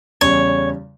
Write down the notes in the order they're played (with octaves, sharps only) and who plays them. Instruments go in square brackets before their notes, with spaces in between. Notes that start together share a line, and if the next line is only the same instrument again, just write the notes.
[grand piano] E2 C#3 G3 C#4 [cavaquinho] C#5